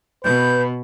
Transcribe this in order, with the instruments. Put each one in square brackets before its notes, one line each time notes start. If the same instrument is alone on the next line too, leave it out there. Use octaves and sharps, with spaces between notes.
[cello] B2 [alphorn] B4 [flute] G6